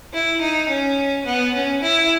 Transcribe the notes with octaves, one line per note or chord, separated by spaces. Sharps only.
E4
D#4
C#4
B3
C#4
E4